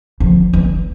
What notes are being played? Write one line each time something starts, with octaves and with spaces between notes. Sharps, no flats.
F2
E2